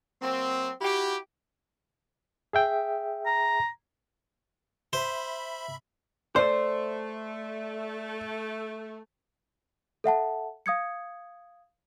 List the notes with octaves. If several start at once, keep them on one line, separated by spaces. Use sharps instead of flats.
F#3 A#3 C4
E4 F#4 G4
G#4 E5 G5
A#5
C5 E5 B5
A3 C5 D5
A4 E5 F#5 A5
F5 D#6 G#6 C#7